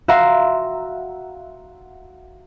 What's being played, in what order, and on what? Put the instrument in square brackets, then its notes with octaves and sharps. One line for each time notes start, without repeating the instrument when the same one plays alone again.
[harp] F#4 E5 F5 A#5 C6